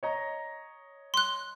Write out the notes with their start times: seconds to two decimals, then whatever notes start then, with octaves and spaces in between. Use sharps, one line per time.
0.03 C#5 D#5 A#5
1.14 C6 F#6